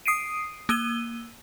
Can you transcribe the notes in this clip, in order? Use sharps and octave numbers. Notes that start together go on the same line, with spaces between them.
D#6 C7 D7 D#7
A#3 E6 D#7 G7